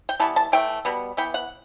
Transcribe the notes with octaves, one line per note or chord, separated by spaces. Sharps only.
G5
E3 G3 B3 A5
A5
E3 A3 G5
B2 G3 B3
E3 B3 G5
F#5